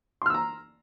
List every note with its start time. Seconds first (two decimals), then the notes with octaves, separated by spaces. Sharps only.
0.22 C6
0.26 F6
0.30 E6
0.34 A#5